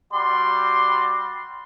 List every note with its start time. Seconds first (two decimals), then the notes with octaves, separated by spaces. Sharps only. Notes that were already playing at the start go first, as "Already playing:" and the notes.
0.13 G3 F#4 D5 C6